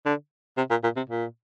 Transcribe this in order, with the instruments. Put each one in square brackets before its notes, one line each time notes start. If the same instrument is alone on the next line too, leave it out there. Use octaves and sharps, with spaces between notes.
[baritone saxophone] D3
C3
A#2
A#2
C3
A#2